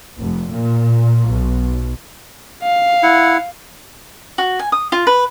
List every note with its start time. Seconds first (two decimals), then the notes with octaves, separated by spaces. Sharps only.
0.18 F1
0.50 A#2
1.27 B1
2.62 F5
3.03 E4 F#5
4.38 F#4
4.59 G#5
4.72 D#6
4.92 F4
5.07 B4